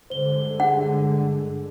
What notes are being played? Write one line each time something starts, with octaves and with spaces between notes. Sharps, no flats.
G2 D3 G#3 C5 G7
D4 G#4 F#5